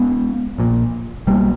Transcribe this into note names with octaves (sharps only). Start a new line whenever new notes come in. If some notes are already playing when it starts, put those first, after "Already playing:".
Already playing: G#3 B3
A#1 A#2
B1 B2 G3 A#3